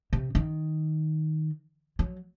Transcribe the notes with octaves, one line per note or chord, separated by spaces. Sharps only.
C3
D#3
F#3